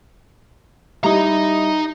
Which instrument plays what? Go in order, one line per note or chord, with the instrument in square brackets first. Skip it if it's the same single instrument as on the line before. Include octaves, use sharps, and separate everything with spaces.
[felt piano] G3 E4 [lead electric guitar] D#4 A#5